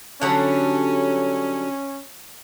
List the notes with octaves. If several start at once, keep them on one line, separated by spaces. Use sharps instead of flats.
D3 F#3 G3 C#4